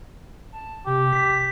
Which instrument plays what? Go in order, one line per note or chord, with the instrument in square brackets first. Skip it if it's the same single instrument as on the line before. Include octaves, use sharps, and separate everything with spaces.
[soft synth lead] A5
[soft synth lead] C3 [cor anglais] G4
[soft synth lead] B6